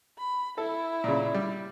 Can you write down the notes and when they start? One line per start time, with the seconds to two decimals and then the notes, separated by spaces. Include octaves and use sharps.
0.18 B5
0.58 E4 A4
1.04 A#2 C#3
1.34 G3